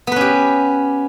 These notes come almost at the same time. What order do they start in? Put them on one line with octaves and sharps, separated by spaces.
B3 B4 C#4 G4